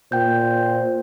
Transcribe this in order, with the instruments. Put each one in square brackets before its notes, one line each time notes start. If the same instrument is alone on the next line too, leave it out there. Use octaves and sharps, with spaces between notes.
[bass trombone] A#2 [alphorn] C5 [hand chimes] G5 G6